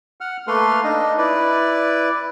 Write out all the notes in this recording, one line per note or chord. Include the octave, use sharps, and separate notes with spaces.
F#5 F6
A3 A#3 A4 B4 C6 F6
D4 D#4 D#5
E4 B4 D5